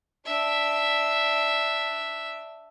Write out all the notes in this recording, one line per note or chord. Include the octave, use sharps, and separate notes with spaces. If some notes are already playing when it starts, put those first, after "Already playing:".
D4 E5